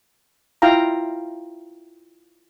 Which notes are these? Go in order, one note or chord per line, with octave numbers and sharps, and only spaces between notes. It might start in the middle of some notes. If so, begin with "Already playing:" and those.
E4 F4 F5 G5 A#5